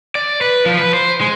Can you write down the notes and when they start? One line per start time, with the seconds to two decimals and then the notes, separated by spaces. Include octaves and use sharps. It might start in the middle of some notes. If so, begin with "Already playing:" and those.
0.15 D5
0.41 B4
0.66 F3
0.78 B4
0.93 C5
1.21 G#3